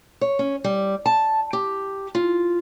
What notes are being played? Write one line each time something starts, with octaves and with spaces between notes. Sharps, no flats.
C#5
C#4
G3
A5
G4
F4